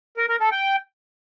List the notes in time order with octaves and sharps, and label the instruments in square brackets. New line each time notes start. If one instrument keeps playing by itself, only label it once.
[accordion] A#4
A#4
A4
G5